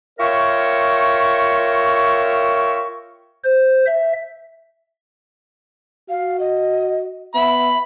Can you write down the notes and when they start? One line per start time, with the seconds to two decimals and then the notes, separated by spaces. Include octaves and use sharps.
0.19 F4 A#4 C#5 E5 G5 C#6
3.44 C5
3.86 E5
6.09 F#4 F5
6.40 D#5
7.35 B3 E5 B5